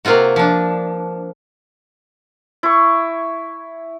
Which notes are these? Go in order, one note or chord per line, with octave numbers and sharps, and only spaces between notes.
C3 A#3 C4 F4 F#4
F3 D4
E4 C#6